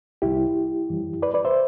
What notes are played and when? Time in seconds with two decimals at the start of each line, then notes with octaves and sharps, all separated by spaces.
0.22 C2 C3 G3 E4 G4
0.89 F#2 E3 G3
1.22 B4 D5
1.34 B4 D5
1.45 C5 E5